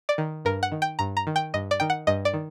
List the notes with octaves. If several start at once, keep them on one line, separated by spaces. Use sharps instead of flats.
D5
D#3
G2 A#4
F#5
D#3
G5
G2 A#5
A#5
D#3
G5
G2 D#5
D5
D#3 G5
F#5
G2 D#5
D5
D#3